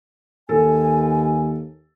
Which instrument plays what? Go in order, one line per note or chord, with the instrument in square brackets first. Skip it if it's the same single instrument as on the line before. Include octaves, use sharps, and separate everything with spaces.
[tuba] D#2 [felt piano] A4 [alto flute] G#5